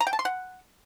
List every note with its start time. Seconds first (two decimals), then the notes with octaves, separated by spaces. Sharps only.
0.01 A#5
0.07 G5
0.13 A5
0.19 C6
0.25 F#5